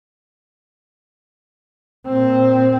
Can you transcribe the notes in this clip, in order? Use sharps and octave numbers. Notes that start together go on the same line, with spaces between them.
A#2 C4